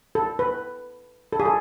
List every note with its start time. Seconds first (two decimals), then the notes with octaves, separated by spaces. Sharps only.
0.15 A4
0.39 B4
1.33 A4
1.40 G#4
1.45 A4